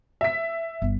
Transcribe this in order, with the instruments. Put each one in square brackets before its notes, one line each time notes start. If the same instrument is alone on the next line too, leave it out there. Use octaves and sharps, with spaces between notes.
[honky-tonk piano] E5 B6
[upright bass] G1